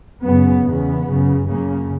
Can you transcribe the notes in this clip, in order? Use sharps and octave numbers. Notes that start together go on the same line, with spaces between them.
F#2 C#3 B3
E2 C#3 B3
F#2 C#3
F#2 C#3 A#3